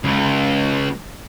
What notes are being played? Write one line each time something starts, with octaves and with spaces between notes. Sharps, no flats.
C#2